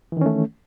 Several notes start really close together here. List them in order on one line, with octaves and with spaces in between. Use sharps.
E3 D#3 C#4 A3